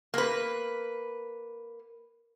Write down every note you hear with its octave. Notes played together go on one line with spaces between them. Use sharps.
A#3 B4